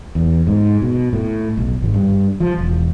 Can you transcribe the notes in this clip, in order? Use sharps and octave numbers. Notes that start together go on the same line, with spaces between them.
E2
G#2
B2
A2
B1
G#1
G2
F3
E1